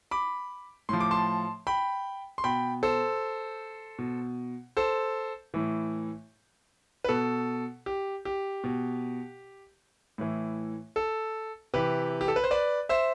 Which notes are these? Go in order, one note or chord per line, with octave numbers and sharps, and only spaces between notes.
B5 D6
A2 F3 C6
D6
A5 C6
G5 B5
C6
B2 G5 B5
A4 C5
B2
A4 C5
A2 E3
B4
B2 A4
G4
G4
B2
A2 E3
A4
C3 E3 G4 B4
G4
A4
B4
C5
B4 D5
C5 E5